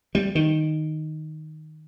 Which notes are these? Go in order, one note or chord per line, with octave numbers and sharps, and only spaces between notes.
G3
D#3